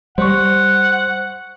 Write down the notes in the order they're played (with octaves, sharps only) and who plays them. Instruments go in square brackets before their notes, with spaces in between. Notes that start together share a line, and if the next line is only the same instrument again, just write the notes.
[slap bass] G3 [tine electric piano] C5 C#6 [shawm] F#5